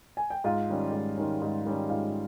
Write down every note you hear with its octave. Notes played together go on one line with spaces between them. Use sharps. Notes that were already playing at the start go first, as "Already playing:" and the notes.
G#5
G5
G#2 F4 F5
D#3 G3 C#4
G#2
D#3 G3 C#4
G#2
D#3 G3 C#4
G#2 F4 F5